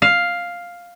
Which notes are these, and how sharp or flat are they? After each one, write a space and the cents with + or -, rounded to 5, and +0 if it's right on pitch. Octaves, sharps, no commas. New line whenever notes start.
F5 +5